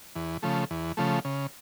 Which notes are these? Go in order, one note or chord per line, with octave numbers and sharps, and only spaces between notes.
E2
C#3 F3 A3
E2
C#3 F3 A3
C#3